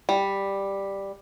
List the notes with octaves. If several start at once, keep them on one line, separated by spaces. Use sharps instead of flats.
G3